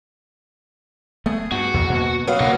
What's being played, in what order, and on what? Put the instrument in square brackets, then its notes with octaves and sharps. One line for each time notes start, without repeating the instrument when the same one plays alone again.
[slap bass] A3 B3 [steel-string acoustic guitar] G#4
[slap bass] G2 [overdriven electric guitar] F#4
[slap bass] E2 A#2 D#3
B2 A#3
[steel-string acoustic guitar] F#3 B3 F5
[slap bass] B2 [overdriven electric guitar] D3 A#3